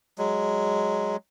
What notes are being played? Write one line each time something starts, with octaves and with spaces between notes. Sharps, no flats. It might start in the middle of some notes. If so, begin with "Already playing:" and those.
F#3 G#3